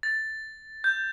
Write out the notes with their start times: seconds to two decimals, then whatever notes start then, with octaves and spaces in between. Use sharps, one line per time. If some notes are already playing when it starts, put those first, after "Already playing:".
0.03 A6
0.84 G6